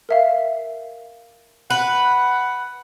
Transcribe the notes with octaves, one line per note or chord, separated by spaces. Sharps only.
A#4 E5 F5
B4 F#5